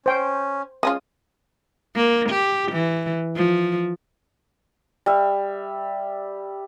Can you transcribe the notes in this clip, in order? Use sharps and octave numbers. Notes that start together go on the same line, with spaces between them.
C#4 C5 G5
G#3 C#4 F4 D#6
A#3
G4
E3
F3
G3 E5